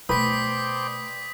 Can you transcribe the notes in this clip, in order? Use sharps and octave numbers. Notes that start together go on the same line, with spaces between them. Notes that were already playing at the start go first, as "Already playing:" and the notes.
B2 A3 B4 C5 D5 G5 D#6 B6